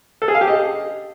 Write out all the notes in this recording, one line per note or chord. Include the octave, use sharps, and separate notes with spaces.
A4
G#4
F5
G4
D#5